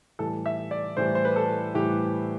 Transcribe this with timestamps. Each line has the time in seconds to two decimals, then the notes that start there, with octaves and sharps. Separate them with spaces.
0.19 A2 E3 G3 A4
0.46 E5
0.71 D5
0.97 A2 E3 G3 C5
1.15 C5
1.25 B4
1.36 A4
1.74 A2 E3 G3 G4